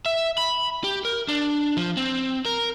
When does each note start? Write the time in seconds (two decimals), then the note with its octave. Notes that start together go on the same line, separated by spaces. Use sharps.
0.06 E5
0.38 B5
0.84 G4
1.05 A#4
1.28 D4
1.77 F3
1.97 C4
2.45 A#4